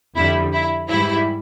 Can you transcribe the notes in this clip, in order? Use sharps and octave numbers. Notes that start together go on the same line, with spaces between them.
F2 D3 G3 E4
E4
G#2 E3 G3 E4